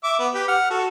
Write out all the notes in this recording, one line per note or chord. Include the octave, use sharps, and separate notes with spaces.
E5 D6
B3
G4 B4
F#5 F6
F#4 A4